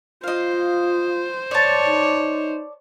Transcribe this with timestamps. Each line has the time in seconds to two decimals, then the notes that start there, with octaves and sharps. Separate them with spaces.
0.23 F4 C5 D#5 F5
1.51 C#5 D5 A5
1.86 D#4